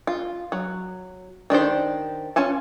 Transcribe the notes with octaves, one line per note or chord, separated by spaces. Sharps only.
F4
F#3
D#3 D4 G4 C5
C#4 F4 G#5 A5